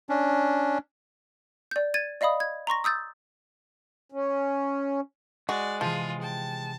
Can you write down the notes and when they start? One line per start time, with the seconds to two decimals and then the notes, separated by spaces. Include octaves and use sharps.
0.09 C#4 D4
1.71 D5 G6
1.94 G#6 A6 D#7
2.21 D5 D#5 F5 B5 D#6
2.40 G#6
2.67 A#5 C6 C#6 A#6
2.84 D#6 E6 G6 A6
4.12 C#4
5.49 G#3 F#4 D5
5.81 C3 E3 F3 F4 G#4
6.22 G5 A5